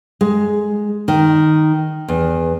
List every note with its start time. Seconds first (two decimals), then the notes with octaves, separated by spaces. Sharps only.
0.21 G#3
1.08 D#3
2.08 E2